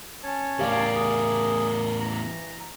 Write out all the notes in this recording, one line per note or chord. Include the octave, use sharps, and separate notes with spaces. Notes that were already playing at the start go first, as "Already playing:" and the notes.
C#4 C#5 A5
E2 A2 G4 A#4 D5 F5
G#4
E3 A#5